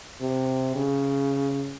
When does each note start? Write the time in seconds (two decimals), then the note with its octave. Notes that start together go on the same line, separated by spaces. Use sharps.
0.21 C3
0.76 C#3